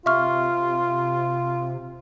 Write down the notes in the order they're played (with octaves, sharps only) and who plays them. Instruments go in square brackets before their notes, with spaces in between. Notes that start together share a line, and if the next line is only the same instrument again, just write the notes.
[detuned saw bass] C3 [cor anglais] F4 [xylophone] E5 C#6 F6